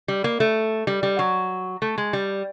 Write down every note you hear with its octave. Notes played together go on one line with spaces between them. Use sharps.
G3
A#3
A3
G3
G3
F#3
A3
G#3
G3